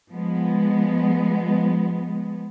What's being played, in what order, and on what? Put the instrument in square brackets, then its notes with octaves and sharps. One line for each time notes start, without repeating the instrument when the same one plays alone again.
[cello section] F3 G#3 B3